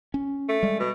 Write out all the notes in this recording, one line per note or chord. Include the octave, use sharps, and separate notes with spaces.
C#4
A3
G3 G#3
B2